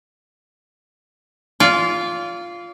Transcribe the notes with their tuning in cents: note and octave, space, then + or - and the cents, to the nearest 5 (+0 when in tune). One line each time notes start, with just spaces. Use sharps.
F4 -5 D5 -35